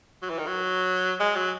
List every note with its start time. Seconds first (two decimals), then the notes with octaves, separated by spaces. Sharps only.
0.22 F#3
0.30 E3
0.39 D#3
0.47 F#3
1.20 G#3
1.36 F#3